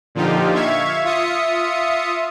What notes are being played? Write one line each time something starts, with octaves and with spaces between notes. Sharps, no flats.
A#2 D3 F3 D#4 F4 G4
E5 F5 C#6 G#6
F4 E5 D#6 C#7